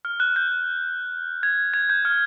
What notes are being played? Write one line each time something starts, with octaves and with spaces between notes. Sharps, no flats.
F6
F#6
G6
G#6
G#6
G6
F6